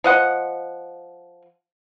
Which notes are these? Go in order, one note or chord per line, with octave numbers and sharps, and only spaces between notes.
F3 D#5 F#5